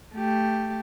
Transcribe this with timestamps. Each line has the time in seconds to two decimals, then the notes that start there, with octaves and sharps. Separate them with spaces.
0.15 A3 G4